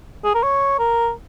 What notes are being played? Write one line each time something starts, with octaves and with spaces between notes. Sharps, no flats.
G#4
A#4
C#5
A#4